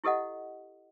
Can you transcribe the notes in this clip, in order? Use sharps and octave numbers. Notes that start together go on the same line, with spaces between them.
E4 G4 A4 D#5 F#5